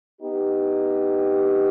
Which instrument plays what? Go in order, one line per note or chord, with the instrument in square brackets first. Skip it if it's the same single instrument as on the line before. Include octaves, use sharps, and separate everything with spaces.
[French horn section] B3 D#4 G4